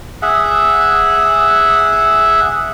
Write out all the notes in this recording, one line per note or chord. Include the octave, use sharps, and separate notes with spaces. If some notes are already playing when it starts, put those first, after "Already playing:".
G#4 E5 F#5